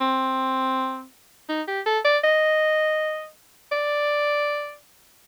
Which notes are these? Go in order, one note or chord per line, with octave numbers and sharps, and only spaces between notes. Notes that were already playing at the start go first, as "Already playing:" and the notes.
C4
D#4
G4
A4
D5
D#5
D5